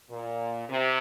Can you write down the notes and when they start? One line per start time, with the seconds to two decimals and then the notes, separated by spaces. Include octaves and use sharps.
0.11 A#2
0.69 C3